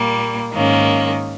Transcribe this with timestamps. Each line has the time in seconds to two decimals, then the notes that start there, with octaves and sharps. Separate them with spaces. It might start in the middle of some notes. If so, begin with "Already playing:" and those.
Already playing: A#2 G3 A#3
0.53 G#2 D#3 A#3 C#4